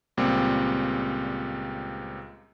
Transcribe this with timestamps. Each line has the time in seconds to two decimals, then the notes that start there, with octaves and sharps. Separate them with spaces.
0.17 C#2 A#2 G3 C4